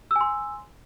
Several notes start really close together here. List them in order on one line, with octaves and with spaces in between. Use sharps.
E6 G#5 C6